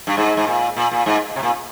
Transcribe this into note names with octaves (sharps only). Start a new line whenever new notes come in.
G2
G#2
G#2
A#2
A#2
A#2
G#2
C3
A#2